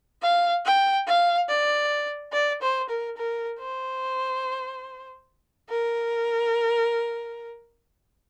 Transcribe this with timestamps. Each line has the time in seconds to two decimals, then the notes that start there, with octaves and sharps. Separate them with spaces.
0.22 F5
0.65 G5
1.07 F5
1.49 D5
2.33 D5
2.62 C5
2.90 A#4
3.17 A#4
3.60 C5
5.70 A#4